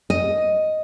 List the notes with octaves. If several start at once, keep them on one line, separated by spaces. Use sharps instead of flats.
D#5